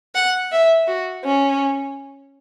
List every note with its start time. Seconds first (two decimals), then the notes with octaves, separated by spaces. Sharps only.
0.15 F#5
0.52 E5
0.88 F#4
1.24 C#4